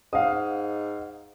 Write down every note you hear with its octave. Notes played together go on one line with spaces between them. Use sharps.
G#2 F5 F#5 D#6